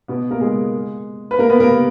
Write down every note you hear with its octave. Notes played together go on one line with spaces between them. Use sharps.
B2 B3
A#3 A#4
G#3 G#4
B4
A#3 A#4
B3 B4
A#3 A#4